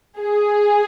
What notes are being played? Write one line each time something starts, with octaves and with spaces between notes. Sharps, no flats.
G#4